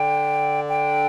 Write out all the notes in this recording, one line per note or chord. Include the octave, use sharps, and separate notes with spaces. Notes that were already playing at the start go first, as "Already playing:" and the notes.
Already playing: D3 G5
G5